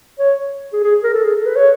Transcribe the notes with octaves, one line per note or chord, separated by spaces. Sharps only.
C#5
G#4
G#4
A#4
A4
G#4
A4
B4
C#5